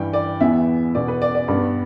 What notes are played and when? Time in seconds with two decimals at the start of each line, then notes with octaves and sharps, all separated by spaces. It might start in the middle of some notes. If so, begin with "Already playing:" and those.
Already playing: G2 E3 G3 G5
0.13 D5
0.41 E2 E3 B3 E5
0.95 E2 B2 B3 D5
1.08 B4
1.22 D5
1.35 D5
1.48 G2 G3 B3 D5